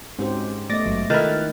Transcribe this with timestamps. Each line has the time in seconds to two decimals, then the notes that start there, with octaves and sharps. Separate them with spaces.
0.19 G#2 C4 C#4 F#4 G4 C5
0.70 A3 B3 D5 D#5 D6 A6 A#6
0.85 G#1 G2 F#3 G#3
1.10 D#3 E4 F4 A4 B4 F6 F#6 A6